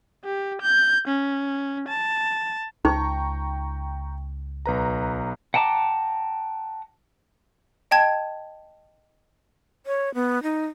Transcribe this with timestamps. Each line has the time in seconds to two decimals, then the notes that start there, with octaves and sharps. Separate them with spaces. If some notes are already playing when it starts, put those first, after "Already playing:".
0.25 G4
0.62 G6
1.08 C#4
1.89 A5
2.85 C#2 D#4 G5 A#5 C#6
4.66 B1 B4 A#5
5.54 F#5 G5 A5 A#5 D6
7.91 D#5 G5 A5 G#6
9.86 C#5
10.14 B3
10.43 D#4